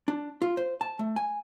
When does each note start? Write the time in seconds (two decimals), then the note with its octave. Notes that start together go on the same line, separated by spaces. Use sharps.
0.08 D4
0.42 F4
0.57 C5
0.81 A5
0.99 A3
1.16 G#5